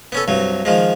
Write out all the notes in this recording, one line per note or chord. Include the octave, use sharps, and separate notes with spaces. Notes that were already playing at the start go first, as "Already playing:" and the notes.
B3 C#4 A4
C2 G2 F#3
D#3 F3 G#3